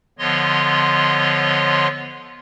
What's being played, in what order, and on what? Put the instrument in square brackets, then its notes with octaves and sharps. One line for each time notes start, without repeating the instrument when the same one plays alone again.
[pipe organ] D3 F3 B3 C#5 D#5 C6